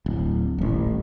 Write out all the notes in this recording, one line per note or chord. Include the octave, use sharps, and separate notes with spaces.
D1
D#1 A1